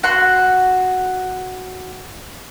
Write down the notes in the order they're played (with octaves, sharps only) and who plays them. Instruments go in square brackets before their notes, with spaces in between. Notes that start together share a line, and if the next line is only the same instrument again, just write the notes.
[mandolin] F#4 F#5 C6